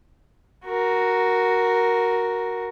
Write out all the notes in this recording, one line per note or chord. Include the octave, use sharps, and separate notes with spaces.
F#4 A#4